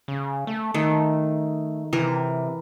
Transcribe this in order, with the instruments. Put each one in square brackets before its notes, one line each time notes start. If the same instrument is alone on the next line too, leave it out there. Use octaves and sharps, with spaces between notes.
[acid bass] C#3
A3
[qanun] D#3 [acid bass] A3
[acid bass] C3 [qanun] E3 A#4